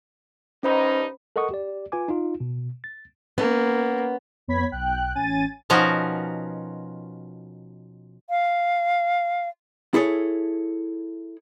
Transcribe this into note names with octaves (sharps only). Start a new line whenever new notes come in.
G2 C#4 D#4 C5 B5
A4 A#4 D#5 F#5 C#6 D#6
G4 D5
F4 B4 G#5 D6
D#4 F4
B2
A6
A#3 B3 C#4
F2 B3 C#5 B5 G#6 B6
B1 G5 F#6
A1 C#4 G#5 A6 D#7
B2 F3 C#4 D#4 F#4 A#4
F5
E4 G#4 A4 C#5